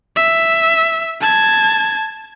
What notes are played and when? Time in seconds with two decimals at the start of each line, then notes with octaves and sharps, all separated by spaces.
0.16 E5
1.21 A5 G#6